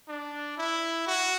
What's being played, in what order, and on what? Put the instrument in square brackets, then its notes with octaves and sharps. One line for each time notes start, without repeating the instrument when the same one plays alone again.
[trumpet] D4
E4
F#4